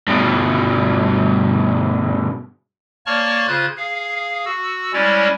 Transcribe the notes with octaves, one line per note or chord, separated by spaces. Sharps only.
G2 B2
A#3 C#5 D5 A5 C#6 F6
C#3 F4 C5 F#6 G#6
G#4 F5
F#4 E6
G3 G#3 C#4 E4 C#5 D5